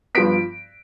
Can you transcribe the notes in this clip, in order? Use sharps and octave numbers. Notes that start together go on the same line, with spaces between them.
G2 F3 B3 B6 D7